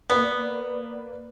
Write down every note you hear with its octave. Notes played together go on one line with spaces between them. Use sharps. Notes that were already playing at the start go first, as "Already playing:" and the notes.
A#3 B3 B4 D5